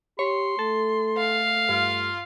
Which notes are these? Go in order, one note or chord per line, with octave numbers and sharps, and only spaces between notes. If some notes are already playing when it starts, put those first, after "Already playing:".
G4 C#5 C6
A3 A4
F5
G2 F4